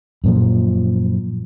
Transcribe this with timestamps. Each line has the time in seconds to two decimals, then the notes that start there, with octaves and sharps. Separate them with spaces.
0.24 F#2 A#2 F3